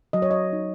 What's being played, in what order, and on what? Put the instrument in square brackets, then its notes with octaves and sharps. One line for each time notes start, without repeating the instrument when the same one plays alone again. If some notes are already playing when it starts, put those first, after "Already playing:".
[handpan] F#3 D#5
C#5
D#5
D#4